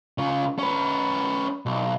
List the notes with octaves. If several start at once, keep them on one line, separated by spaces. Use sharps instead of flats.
C#3 F4
C#4 B4
B1